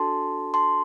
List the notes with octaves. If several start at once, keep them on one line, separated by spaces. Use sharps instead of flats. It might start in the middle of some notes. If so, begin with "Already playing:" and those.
Already playing: D4 F#4 A4 A5 C6
A5 C6